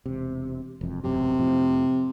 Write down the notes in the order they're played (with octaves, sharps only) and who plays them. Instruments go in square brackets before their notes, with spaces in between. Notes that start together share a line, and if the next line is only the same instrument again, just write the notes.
[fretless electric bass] E1 C3
E1 F2
[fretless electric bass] E1 A1 F#2 [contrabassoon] C3
[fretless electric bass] F2 A2 F3